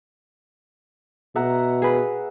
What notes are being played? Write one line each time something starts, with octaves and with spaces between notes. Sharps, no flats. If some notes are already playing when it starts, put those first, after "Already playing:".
B2 E5 F#5 A#5
G#4 B4